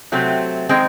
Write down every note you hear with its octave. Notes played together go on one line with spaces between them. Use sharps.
C3 F#3 A3 C4
D#3 G#3 C4